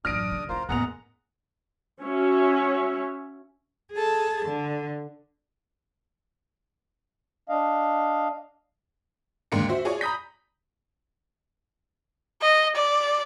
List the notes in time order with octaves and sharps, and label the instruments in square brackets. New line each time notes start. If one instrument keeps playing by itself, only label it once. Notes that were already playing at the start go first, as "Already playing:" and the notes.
[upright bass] A1 F#2 [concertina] D4 D#6 [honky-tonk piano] F6 A#6 D7
[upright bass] C#3
[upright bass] C#2 E4 [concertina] F4 A#4 C5
[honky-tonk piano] F#1 B3 F7 [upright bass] E2 A2 [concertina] G#4 F#5 A#5
[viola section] C#4 F#4 C#5 E5
[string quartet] G#4 A4 A5
D3
[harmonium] D4 D#5 F5
[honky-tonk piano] D#2 G#2 D3 A#3 D4 C#7
F#4 C5 E5
F4 G#4 C#5 D5 G#5 C#6
A#5 B5 D#6 G6 B6
[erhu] D#5
D5